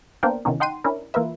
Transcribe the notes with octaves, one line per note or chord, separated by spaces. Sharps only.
A#3 B3 D4 A#4 C5 G5
C3 D#3 E3 B3 C#4 D#4
D#4 F#5 G5 C6 C7 D#7
C#4 D4 E4 A#4
E3 A#3 F4 A#4 B4 E5